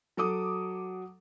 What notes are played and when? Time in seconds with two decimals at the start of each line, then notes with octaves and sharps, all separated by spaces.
0.17 F#3 A4 D6 D#6